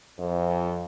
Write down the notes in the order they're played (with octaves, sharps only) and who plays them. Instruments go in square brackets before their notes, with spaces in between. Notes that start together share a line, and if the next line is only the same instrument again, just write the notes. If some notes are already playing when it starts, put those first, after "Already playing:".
[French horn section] F2